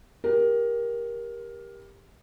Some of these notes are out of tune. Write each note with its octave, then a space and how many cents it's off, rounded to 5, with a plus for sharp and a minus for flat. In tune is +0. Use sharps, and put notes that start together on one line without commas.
G4 +15 A#4 +15